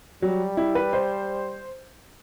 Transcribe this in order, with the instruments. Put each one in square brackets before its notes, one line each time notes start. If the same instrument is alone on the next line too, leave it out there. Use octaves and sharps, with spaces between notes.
[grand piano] F#3 [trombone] G3
[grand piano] E4
B4
C5